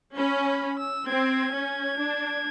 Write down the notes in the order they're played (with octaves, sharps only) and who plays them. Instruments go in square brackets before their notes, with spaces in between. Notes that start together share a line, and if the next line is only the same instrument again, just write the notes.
[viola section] C#4 [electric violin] B5
[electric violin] B5
E6
[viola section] C4 [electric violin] G#6
[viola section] C#4
D4